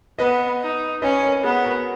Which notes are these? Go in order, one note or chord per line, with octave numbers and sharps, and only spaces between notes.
B3 B4 D#5
D#4
C#4 B4 D#5
A#4 C#5
B3 G#4 B4
F#4 A#4